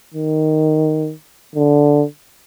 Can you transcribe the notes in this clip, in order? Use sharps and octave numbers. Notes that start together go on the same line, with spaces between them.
D#3
D3